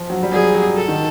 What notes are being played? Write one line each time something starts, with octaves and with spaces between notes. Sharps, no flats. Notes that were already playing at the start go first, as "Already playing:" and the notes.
Already playing: F3
F#3
G3
F#3 G#4
F#3
A4
D#3